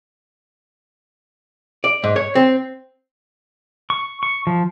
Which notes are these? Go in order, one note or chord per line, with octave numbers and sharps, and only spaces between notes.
D5
G#2
C#5
C4
C#6
C#6
F3